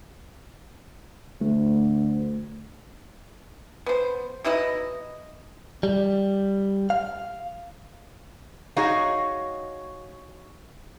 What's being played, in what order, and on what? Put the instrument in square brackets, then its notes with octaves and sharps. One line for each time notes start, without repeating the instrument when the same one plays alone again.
[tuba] D2 [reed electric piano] A3
[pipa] B3 C5
B2 D#4 E4 D#5
[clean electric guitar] G3
F5
[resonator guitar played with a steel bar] D#4 F#4 G#4 C#5 D#5 F5